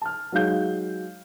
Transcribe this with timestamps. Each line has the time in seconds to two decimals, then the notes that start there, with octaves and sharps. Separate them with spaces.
0.02 A5 F6
0.32 F#3 G#3 D#4 F5 G6